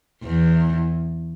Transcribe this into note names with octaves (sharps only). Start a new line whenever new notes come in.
E2